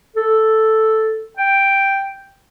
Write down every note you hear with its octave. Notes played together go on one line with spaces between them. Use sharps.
A4
G5